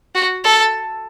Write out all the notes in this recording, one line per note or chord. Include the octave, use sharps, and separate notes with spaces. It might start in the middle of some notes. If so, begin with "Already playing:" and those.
F#4
A4